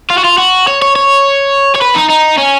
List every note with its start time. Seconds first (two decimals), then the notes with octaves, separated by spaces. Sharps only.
0.11 F4
0.18 F#4
0.25 F4
0.38 F#4
0.68 C#5
0.82 C#5
0.96 C#5
1.76 C#5
1.82 B4
1.96 D#4
2.10 D#4
2.39 C#4